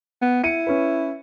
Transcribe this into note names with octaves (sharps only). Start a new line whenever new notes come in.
B3
E4 C#7 D#7
C#4 B4